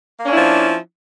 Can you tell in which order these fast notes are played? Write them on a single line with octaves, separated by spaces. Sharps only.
A#3 D4 C#4 E4 F3